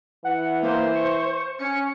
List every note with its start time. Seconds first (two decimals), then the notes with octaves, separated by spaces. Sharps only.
0.24 E3 F#5
0.63 A#3 C5
0.95 C#6
1.59 C#4 C#7